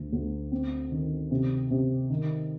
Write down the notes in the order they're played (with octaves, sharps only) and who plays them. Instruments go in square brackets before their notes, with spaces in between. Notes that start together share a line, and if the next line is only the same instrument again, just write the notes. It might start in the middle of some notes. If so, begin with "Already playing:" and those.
Already playing: [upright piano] D2
D2
C4
D#3
C3
C3
D#3